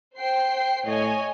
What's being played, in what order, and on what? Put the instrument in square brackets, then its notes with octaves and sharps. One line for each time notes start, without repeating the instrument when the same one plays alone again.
[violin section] C5 G5 C7
[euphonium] A2 [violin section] C#5 D#5 G#5